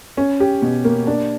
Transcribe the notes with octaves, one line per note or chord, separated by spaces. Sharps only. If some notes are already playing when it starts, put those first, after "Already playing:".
C#4
G4
B2
A#3
D4